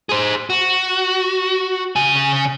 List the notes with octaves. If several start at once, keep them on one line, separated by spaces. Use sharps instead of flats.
G#4 C5
F#4
C#3 G#5